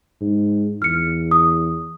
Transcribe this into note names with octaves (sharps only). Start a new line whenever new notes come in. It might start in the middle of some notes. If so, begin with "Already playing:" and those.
G#2
E2 F6 C#7
D#6